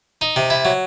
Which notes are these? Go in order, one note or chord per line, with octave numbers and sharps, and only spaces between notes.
D#4
C3
E4
F#3